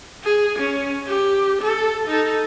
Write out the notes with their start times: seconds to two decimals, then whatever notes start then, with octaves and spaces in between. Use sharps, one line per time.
0.24 G#4
0.59 C#4
1.07 G4
1.61 A4
2.07 D#4 A4